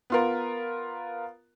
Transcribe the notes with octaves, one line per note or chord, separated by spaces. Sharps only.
B3 F4 A#4